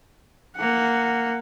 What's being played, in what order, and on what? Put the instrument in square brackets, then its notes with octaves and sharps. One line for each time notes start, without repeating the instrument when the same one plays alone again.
[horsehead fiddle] A#3 F#5